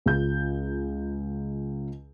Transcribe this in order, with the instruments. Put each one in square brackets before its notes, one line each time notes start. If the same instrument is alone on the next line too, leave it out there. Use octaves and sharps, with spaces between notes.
[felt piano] C#2 F4 G6